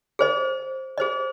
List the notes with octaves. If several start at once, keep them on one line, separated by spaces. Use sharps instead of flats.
G#4 C5 D#5
G#4 C5 D#5